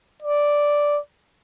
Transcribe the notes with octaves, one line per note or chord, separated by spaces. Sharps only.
D5